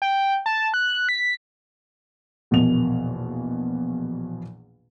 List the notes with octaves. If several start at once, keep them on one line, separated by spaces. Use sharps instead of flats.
G5
A5
F#6
B6
A#1 E2 B2 A#3 F7